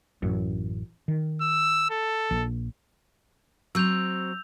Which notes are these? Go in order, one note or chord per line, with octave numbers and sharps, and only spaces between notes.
A1 F#2
D#3
E6
A4
A#1
F#3 C4 E6 G6 F7